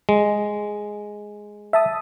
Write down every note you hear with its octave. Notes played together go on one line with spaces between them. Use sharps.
G#3
E5 A5 D#6